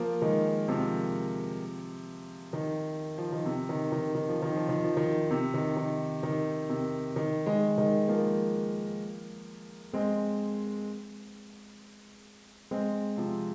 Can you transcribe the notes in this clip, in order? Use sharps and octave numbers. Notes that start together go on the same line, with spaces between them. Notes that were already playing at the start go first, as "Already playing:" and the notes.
Already playing: F3 A#3
D#3 G#3
C3 F3
D#3
F3
D#3
C3
D#3
D#3
D#3
F3
D#3
F3
D#3
F3
D#3
C3
D#3
D#3
D#3
C3
D#3
D#3 G#3
D#3 G#3
F3 A#3
G#3 C4
G#3 C4
C3 F3